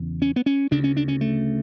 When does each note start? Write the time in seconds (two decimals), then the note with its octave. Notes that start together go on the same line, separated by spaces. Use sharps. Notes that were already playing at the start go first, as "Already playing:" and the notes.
Already playing: E2 C#3
0.22 C#4
0.36 B3
0.46 C#4
0.71 D2 C#3 D4
0.84 C#4
0.97 D4
1.08 C#4
1.21 A3